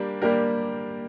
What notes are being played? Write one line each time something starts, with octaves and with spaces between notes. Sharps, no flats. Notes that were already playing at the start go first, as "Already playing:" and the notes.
Already playing: G3 A#3 D4 G4
G3 A#3 D4 G4 A#4